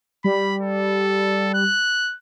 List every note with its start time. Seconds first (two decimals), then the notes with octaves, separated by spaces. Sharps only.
0.24 G3 B5
0.61 A4
1.54 F#6